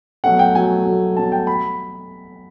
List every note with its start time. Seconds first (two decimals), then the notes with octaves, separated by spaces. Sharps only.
0.24 B2 F#3 A3 F#5
0.39 G5
0.55 B2 F#3 A3 G#5
0.85 B2 F#3 A3
1.16 B2 F#3 A3 A5
1.32 G5
1.47 B5